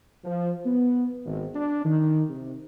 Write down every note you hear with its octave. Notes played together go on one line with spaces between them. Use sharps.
F3
B3
G#1
D4
D#3
C3